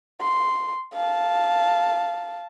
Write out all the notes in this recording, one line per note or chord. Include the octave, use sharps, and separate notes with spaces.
C6
F5 A5